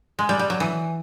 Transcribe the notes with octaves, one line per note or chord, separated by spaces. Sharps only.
G#3
G3
G3
F#3
E3